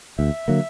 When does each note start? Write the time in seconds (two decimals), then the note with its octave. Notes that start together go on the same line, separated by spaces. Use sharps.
0.18 D2 E5
0.48 D3 F#3 A#3